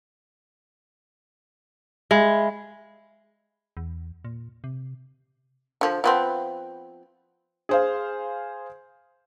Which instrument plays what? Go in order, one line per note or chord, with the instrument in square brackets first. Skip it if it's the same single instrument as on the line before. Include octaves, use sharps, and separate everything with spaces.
[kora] G#3 [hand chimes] E5 F5 B5
[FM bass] E2
A#2
C3
[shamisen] D3 F3
F3 B3 C4
[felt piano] G#4 C5 F5